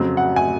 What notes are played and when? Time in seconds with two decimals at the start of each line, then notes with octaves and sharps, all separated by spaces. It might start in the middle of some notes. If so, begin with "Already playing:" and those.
Already playing: F2 C#3 F#3 C4
0.17 F#5
0.36 G#5